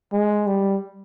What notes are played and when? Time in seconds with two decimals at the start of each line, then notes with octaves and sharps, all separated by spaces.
0.13 G#3
0.47 G3